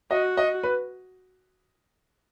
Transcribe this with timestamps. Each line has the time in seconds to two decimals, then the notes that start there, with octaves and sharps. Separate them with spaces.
0.11 F#4 D#5
0.37 D#5
0.63 B4